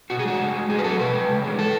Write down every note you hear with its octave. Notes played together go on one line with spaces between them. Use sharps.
B2 F#4
G#4
G#3 F#4
C#3
G#3
A2 G#4
B4
F#3 A4
B2 B4
G#3
C#3
E3 G#3
A2 A4